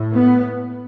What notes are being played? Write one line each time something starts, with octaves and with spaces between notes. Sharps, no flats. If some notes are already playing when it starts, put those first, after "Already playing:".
Already playing: A2
B3